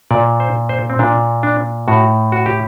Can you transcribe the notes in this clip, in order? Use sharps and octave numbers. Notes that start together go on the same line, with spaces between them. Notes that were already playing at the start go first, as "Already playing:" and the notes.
A#2 D5
C5
C5
C4
A#2 D4
D4
A2 F#4
F#4
G4